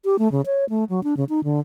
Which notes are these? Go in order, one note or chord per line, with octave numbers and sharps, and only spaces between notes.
G4
A3
C#3
C#5
A3
F#3
D4
C#3
D#4
D3